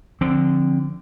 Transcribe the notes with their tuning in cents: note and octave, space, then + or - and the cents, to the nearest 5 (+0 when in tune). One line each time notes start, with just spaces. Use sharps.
D3 +0 F3 +5 C4 +10